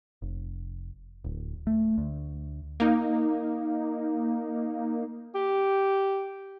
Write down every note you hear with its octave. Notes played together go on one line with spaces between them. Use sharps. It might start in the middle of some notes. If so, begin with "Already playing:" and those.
F1
D1
A3
D2
A#3 D#4
G4